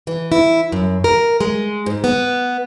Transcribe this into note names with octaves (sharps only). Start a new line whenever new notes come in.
E3
E4
F#2
A#4
G#3
G#2
B3